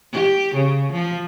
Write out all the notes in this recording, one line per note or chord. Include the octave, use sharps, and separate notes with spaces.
G4
C#3
F3